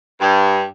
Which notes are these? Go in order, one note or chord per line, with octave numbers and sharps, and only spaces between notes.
G2